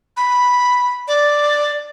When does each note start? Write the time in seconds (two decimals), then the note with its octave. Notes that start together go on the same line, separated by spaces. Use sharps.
0.17 B5
1.08 D5